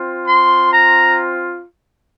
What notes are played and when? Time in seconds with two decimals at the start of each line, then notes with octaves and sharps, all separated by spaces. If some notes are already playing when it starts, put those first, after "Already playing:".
Already playing: C4 F4
0.27 C6
0.73 A#5